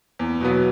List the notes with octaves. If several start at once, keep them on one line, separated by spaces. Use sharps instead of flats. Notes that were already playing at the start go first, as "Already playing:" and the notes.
E2
B2 F#3 B3